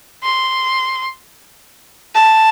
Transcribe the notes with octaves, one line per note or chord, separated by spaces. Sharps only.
C6
A5